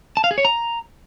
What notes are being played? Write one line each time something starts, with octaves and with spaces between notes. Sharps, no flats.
A5
F5
G#4
C#5
A#5